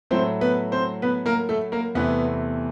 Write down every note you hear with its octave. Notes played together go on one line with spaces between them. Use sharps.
A2 F#3 A3 C4 C5
B3 B4
C4 C5
B3 B4
A#3 A#4
A3 A4
A#3 A#4
E2 C3 E3 A3 B3 B4